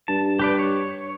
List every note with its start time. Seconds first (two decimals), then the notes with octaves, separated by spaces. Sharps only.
0.08 G2 A5
0.39 G4 B4 D5
0.59 C#5